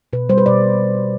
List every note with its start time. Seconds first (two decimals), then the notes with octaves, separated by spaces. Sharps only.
0.13 B2 B4
0.29 G3 C5
0.38 B4
0.46 B2 D5